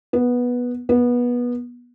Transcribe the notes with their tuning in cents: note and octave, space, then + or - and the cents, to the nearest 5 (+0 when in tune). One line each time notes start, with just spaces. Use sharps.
B3 -10
B3 -20